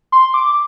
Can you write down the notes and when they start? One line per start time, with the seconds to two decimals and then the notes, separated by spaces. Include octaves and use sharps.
0.12 C6
0.34 D6